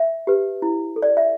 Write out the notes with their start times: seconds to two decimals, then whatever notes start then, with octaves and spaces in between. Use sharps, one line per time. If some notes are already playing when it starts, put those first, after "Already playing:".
Already playing: E5
0.27 G4 B4
0.62 E4
0.96 A4
1.02 D5
1.17 E5